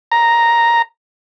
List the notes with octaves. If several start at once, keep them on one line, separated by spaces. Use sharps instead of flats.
A#5